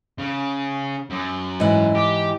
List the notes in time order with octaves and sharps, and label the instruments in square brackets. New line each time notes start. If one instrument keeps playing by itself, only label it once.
[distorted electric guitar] C#3
F#2
[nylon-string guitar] G#2 E3
[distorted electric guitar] G4